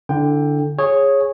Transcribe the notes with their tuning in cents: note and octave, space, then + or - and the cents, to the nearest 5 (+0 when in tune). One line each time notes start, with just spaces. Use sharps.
D3 +0 E4 +0 G5 +15
G#4 +0 C#5 -10